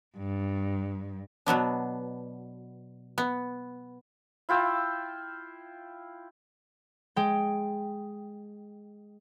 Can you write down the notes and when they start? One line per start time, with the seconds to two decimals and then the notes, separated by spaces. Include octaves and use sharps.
0.17 G2
1.46 B2 F#3 B3 D4
3.18 B3
4.49 E4 F4 G5 E6
7.16 G#3 G5